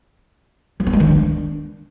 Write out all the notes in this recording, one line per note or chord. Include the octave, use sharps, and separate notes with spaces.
F#3
B3
G#3
D#3
D4